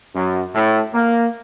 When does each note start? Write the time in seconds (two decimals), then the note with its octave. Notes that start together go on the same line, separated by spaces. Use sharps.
0.15 F#2
0.55 A2
0.94 A#3